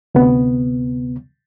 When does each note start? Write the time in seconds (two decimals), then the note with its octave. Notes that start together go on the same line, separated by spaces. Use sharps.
0.15 D2 C3 B3